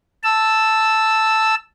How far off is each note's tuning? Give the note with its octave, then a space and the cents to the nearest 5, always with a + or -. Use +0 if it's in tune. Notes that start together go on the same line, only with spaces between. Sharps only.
A5 +0 E6 +0